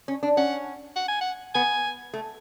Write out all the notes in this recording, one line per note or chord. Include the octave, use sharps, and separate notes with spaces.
C#4
D4
C#4 F#5
F#5
G#5
F#5
B3 G#5
A3